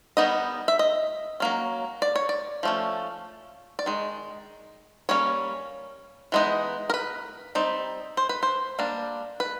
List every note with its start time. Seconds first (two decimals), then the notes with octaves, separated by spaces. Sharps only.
0.17 D#3 G3 B3 D#4 D#5
0.68 E5
0.79 D#5
1.40 F#3 A#3 C#4
2.02 D5
2.16 C#5
2.29 D5
2.63 F3 A3 C#4
3.79 D5
3.86 D#3 G#3
5.09 G3 A#3 C#4 C#5
6.32 E3 G#3 B3 D#4
6.90 A#4
6.94 B4
7.55 G3 C4 D#4
8.17 C5
8.29 B4
8.43 C5
8.79 G3 A#3 D4
9.40 B4